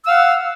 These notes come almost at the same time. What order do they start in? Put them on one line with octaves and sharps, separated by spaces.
E6 F5 F#5